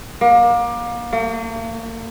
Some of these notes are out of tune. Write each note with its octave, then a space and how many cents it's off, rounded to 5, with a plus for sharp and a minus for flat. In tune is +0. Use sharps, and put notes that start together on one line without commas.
A#3 +30
A#3 -45